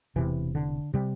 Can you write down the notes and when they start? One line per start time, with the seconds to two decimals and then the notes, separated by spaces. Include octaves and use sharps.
0.16 E1 E2 C3 E3
0.55 D3
0.94 C3 G3